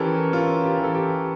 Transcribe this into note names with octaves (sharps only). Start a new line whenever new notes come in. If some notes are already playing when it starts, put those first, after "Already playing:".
Already playing: E3 C#4 G4 A4 A#4
C#4 F4
G4
E3 A4
G4